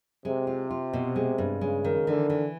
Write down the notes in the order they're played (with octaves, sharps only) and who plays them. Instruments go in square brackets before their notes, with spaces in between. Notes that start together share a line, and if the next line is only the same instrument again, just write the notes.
[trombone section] C3 [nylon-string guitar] G#3
[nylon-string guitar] F4
F4
B2
G#3
G2
[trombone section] C#3 [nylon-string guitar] G#3
[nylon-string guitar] D#3
[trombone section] D3 [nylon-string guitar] E3
[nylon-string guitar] E3